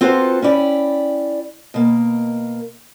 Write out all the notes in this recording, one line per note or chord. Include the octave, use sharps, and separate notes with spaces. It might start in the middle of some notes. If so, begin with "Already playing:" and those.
C4 F4 F#4 A4 B4 C5
C#4 E4 D5 G5
B2 A#3